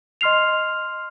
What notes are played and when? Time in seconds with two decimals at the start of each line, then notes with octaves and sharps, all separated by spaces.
0.21 D#5 C6 F6 C7 F7